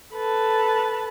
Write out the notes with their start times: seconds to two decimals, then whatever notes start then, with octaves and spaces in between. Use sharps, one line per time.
0.14 A4 B4 A5